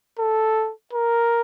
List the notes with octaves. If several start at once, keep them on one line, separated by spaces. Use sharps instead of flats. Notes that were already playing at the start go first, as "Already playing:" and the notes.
A4
A#4